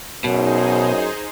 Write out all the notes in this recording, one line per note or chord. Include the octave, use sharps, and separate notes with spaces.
F#2 B2 D#4 G#4 C5